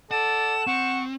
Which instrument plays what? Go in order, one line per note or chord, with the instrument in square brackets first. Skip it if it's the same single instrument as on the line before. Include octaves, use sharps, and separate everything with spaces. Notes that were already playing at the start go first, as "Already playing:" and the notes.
[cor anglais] A4 [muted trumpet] D5 [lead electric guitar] F#5 [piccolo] E7
[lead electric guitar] C4 [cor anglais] F#5 [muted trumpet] C#6